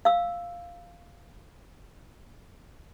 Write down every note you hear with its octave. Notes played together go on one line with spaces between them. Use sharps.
F5 E6